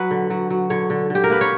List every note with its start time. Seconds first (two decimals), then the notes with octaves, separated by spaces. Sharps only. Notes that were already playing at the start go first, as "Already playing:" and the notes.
Already playing: F#3 B4
0.11 D3
0.30 F#3
0.50 F#3
0.70 D3 C#5
0.90 D3
1.10 D3 G4
1.24 A#4
1.30 A#3 B4
1.41 C#5